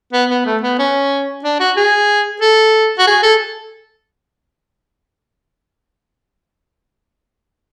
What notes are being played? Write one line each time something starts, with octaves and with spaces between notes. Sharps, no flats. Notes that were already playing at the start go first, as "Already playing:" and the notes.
B3
B3
A3
B3
C#4
D4
F#4
G#4
A4
F#4
G#4
A4